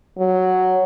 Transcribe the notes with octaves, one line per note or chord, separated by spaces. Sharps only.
F#3